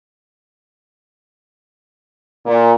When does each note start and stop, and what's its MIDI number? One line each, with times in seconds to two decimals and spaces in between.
2.46 2.73 46